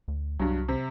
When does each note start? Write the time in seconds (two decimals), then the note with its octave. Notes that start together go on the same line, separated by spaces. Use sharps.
0.08 D2
0.39 C2 G2 F#3
0.68 C3